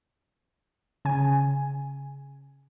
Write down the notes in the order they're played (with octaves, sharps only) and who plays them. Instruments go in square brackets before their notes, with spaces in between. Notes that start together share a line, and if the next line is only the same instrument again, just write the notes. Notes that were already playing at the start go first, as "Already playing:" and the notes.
[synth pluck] C#3 G#5